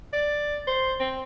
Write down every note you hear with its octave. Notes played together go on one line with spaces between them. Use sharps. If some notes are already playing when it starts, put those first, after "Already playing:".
D5
C5
C4